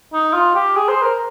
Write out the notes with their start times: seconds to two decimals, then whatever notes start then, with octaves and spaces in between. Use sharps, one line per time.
0.14 D#4
0.33 F4
0.55 G4
0.76 G#4
0.88 C5
1.02 A#4